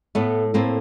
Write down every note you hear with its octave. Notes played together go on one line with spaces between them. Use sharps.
A2 A3 B3
A2 A#3 C4